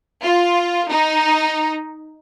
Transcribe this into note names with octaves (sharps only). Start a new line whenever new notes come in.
F4
D#4